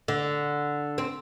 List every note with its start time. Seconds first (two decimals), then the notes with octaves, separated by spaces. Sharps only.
0.08 D3
0.98 C4